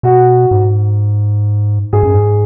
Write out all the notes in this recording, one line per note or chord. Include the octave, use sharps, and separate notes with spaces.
B2 F#4
G#2
G#2 G#4
F#2
G#2